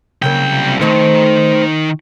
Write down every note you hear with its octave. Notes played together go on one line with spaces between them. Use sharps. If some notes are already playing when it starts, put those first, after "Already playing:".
C2 C#3 F#3 A#3 G5
D#3 A3 C4 C5